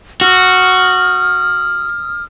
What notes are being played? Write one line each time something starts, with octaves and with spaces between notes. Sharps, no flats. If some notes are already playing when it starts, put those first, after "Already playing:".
F#4 D#6 F6